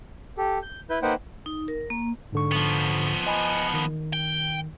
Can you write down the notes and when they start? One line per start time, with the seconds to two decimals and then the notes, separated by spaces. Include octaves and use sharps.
0.38 G4 A4
0.62 G6
0.90 E4 B4 G6
1.02 A#3 D#4 B4 C5 F#5 G5
1.46 D#4
1.68 A#4
1.90 A#3
2.32 G#2 D3 C#6
2.52 F3 B3
3.27 D#5 G#5 B5
3.74 D#3
4.13 G5